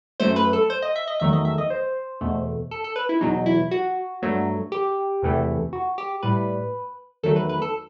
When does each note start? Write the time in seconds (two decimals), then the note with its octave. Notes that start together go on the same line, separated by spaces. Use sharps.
0.20 F#2 F#3 A3 C5
0.36 B4
0.53 A4
0.70 C5
0.82 D#5
0.96 E5
1.07 D#5
1.20 E2 D#3 F#3 A3 E5
1.33 D#5
1.45 E5
1.58 D#5
1.70 C5
2.21 E2 B2 A3
2.71 A4
2.84 A4
2.96 B4
3.09 E4
3.21 E2 B2 F#3 D#4
3.46 E4
3.71 F#4
4.22 G2 F#3 A3
4.72 G4
5.23 E2 C3 E3 A3
5.73 F#4
5.98 G4
6.23 A2 G3 B4
7.23 E2 D#3 F#3 A3 A4
7.36 B4
7.49 B4
7.62 A4